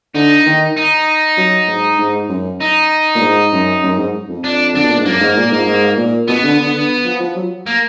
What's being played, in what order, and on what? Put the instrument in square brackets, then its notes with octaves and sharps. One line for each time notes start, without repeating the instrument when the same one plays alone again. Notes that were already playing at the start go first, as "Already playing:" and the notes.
[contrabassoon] D3 [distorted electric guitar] D#4
[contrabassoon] D#3
[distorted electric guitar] D#4
[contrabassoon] F#3
G#2
G#2
F#2
[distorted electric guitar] D#4
[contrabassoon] A#2
G#2
F#2
F#2
G#2
F2
[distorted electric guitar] D4
[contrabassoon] D3 [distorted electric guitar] D4
[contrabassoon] B2
A#2
G#2
[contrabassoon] F#2 [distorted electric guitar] A#3
[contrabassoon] G#2
A#2
G#2
G#2
A#2
[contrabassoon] B2 [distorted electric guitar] B3
[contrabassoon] B2
D3
D3
D3
F3
F3
F#3
[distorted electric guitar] A#3